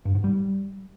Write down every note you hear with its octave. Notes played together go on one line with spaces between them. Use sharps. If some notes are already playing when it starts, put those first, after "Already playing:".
G2
G#2
G3